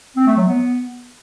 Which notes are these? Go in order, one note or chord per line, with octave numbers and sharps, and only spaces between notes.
C4
A3
F#3
B3